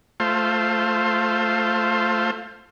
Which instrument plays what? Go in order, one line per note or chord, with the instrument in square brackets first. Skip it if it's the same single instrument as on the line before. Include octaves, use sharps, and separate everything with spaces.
[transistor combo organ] A3 F4 C5